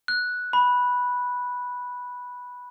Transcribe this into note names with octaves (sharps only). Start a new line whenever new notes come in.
F#6
B5